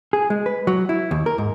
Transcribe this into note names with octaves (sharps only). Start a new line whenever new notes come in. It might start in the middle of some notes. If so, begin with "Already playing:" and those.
G#4
G#3
B4
F#3
E4
D#2
A#4
G#2